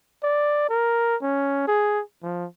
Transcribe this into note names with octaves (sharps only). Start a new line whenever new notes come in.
D5
A#4
C#4
G#4
F3